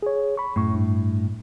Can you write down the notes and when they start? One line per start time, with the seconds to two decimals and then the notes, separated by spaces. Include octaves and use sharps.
0.03 G#4 C#5
0.37 B5 C#6
0.56 F#2 A2 C#6
0.75 G2